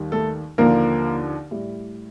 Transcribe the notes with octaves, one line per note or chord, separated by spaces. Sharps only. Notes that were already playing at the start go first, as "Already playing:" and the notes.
Already playing: D#2 D#3 G3
A3 A4
D#2 D3 F3 A#3 A#4
A2 G3